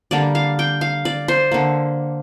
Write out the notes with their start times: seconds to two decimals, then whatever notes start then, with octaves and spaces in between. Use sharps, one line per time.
0.11 D3 G3 A#3 D5
0.35 F5
0.59 G5
0.81 F5
1.05 D5
1.28 C5
1.51 D3 A#3